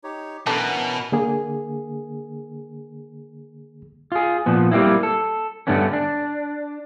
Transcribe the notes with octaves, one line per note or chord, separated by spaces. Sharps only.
D#4 G4 C#5
B2 D3 E3 F#3 C#4 A#4 A5
D3 A#3 G#4
F4 G#4
A#2 F3 B3
G3 A#3 C4 E4
A4
G2 D3 A3 B3 C#4
D4